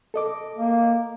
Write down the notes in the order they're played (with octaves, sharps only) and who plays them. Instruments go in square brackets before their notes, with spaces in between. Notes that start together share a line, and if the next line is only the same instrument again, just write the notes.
[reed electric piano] A4 D#5 D6
[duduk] A#3